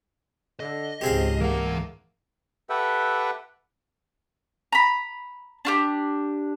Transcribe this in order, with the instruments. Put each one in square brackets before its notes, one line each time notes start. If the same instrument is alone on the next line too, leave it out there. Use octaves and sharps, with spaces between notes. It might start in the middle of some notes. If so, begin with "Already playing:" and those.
[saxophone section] D3 [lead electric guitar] D#5
[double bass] C#2 G#2 [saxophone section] C4 [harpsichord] G4 G#4 F5
[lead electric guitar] E3 F#5 [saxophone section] A3 A#3
[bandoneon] G4 A4 B4 E5 F#5 G5
[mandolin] A#5 B5
D4 F4 G4